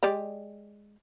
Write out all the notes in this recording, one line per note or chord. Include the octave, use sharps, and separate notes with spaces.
G#3 G4 D5